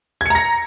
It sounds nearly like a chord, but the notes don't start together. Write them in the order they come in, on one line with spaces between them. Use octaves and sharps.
G#6 C#7 A#5 A#6